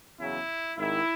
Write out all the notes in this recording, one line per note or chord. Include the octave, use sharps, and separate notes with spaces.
E2 C#3 F#3 E4
G#1 G#2 D#3 E4